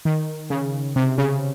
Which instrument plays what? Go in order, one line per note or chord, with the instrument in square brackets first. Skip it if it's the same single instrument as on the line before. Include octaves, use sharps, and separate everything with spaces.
[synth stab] D#3
C#3
C3
C#3